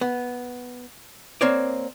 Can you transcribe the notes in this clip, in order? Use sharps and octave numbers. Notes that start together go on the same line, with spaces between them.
B3
A#3 C4 C#5 D5